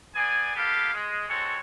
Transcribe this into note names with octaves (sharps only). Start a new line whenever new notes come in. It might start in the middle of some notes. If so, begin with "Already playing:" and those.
B3 G#4 D5 G#5
A#3 B3 G4 A4 B4 F5
G#3
G#3 C4 F#4 A4 C#5